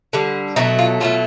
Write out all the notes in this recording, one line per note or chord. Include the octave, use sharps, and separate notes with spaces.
D3 G3
B2 F#3 A3 D#4
F4
B2 F#3 A3 F4